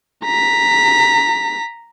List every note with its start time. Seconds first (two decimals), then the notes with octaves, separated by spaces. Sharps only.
0.24 A#5 B6